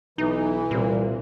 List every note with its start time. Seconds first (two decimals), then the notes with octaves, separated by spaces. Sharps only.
0.18 B1 E3 D#4
0.71 C2 A#2